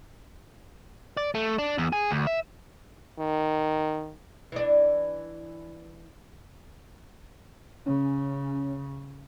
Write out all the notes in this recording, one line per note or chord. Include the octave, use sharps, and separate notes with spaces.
D5
A3
D4
E2
G#4
D2
E5
D#3
E3 D4
C#3 C#4